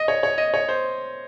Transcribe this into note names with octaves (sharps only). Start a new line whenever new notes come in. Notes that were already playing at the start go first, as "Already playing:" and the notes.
Already playing: D#5
C#5
C#5
D#5
C#5
C5